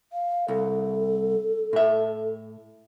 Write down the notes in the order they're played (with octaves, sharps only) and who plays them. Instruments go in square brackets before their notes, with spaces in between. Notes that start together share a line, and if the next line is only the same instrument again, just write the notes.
[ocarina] F5
[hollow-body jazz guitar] C2 [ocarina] A4
[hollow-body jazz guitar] A2 E5